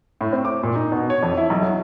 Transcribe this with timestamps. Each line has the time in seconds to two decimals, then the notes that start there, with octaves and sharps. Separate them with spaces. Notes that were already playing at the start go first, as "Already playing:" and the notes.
0.21 A2
0.33 C4
0.45 D6
0.63 A#2
0.76 D#4
0.92 B2
1.10 C#5
1.23 F2
1.37 E4
1.50 B1
1.63 F#3